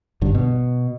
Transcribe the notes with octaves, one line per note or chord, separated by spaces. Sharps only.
G1 G2 D3
B2